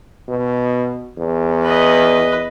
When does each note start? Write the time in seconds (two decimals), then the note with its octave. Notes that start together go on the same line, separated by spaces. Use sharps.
0.28 B2
1.18 E2
1.63 B4 D#5